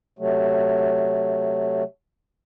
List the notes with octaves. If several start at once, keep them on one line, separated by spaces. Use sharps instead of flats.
C3 F#3 A3